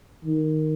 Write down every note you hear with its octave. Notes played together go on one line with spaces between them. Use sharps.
D#3